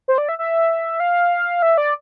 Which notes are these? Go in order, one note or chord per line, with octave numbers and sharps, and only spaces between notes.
C5
D5
E5
E5
F5
E5
D5